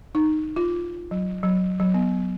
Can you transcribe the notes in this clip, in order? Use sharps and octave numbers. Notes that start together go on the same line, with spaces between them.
D#4
F4
F#3
F#3
F#3
B3